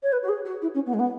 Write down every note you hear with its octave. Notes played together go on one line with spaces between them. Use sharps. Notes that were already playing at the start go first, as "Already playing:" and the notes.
C#5
B4
F#4
G#4
F#4
E4
C#4
B3
G#3
B3